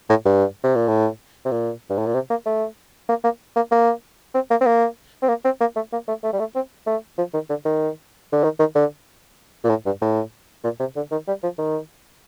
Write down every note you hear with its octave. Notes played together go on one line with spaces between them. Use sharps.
A2
G2
C3
A#2
A2
C3
A#2
G2
A2
A#2
C3
A#3
A3
A#3
A#3
A#3
A#3
C4
A#3
C4
A#3
C4
A#3
C4
A#3
A3
A#3
A3
A3
G3
A3
C4
A3
F3
D#3
D3
D#3
D3
D#3
D#3
D3
A#2
A2
G2
A2
A#2
C3
D3
D#3
G3
F3
D#3